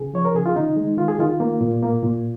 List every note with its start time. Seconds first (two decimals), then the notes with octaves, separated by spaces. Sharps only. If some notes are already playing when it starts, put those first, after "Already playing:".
Already playing: C#3 G#4
0.14 F3 C#5
0.25 A#4
0.35 C#3 G#4
0.46 F4
0.55 D#3 D#4
0.76 G#3
0.97 D#3 F4
1.08 G#4
1.19 D#3 F4
1.40 A#3
1.61 A#2
1.82 A#3
2.03 A#2